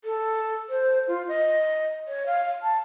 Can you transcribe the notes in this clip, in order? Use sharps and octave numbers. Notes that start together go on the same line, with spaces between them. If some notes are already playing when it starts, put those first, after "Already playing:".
A4
C5
F4
D#5
C#5
F5
A5